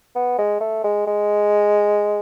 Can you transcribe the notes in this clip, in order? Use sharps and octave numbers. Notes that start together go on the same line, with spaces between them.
B3
G#3
A3
G#3
G#3